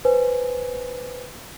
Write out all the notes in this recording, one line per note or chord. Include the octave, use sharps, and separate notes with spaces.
B4 C5 G#5